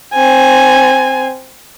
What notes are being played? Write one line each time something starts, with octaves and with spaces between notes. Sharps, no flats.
C4 G#5